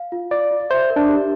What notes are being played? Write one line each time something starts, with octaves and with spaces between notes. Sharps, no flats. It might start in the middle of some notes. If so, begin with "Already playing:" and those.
Already playing: F5
F4
F4 D5
F4
C5 E5
A#4
D4
G4